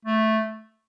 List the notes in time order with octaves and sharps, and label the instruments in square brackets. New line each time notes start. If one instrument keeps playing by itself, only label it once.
[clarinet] A3